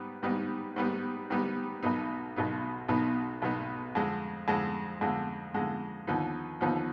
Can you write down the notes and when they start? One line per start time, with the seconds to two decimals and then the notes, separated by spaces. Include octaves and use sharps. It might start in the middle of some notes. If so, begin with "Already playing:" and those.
Already playing: G#2 G3 B3 D#4
0.23 G#2 G3 B3 D#4
0.76 G#2 G3 B3 D#4
1.30 G#2 G3 B3 D#4
1.83 B1 B2 B3 D#4
2.36 B1 B2 B3 D#4
2.88 B1 B2 B3 D#4
3.42 B1 B2 B3 D#4
3.95 F2 D3 G#3
4.48 F2 D3 G#3
5.01 F2 D3 G#3
5.54 F2 D3 G#3
6.07 D#2 D3 F3 B3 D#4
6.61 D#2 D3 F3 B3 D#4